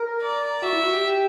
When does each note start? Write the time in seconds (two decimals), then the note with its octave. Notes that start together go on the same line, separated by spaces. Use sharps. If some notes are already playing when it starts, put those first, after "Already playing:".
Already playing: A#4
0.22 D5
0.62 F#4 E5
0.73 E4
0.83 F#4
0.93 G4